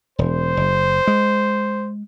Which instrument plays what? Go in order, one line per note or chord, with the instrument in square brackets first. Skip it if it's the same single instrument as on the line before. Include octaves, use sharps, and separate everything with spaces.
[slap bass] E1 [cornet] C5
[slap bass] F#1
G#3